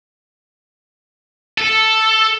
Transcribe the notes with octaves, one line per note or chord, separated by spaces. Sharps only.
A4